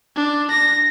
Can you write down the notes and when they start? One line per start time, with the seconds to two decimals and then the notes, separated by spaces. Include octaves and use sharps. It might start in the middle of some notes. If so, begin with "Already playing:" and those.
0.16 D4
0.51 A#6